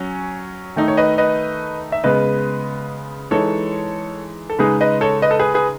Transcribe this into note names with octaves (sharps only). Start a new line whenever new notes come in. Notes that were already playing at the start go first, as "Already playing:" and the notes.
Already playing: F#3 C#4 G#5
D#3 A3 D#4
C#5
B4 D#5
B4 D#5
E5
C#3 G#3 B3 B4 D#5
E3 G#3 D#4 A4 C#5
A4
C#3 G#3 D#4 G#4 B4
B4 D#5
A4 C#5
B4 D#5
A4
G#4 B4
G#4 B4